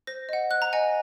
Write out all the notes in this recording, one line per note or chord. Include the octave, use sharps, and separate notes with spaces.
C5 A#6
D#5 F#5
C5 F#6
A#5
D#5 F#5 G#5